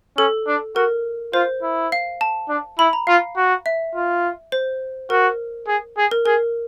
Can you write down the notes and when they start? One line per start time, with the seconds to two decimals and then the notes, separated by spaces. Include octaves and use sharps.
0.17 C#4 A4
0.47 D4
0.76 F#4 A#4
1.33 F4 C5
1.62 E4
1.92 F5
2.21 A5
2.49 D4
2.79 E4 B5
2.93 A#5
3.07 F4 F5
3.36 F#4
3.66 E5
3.95 F4
4.52 C5
5.10 F#4 A#4
5.68 G#4
5.97 G#4
6.11 A#4
6.26 G#4 A#4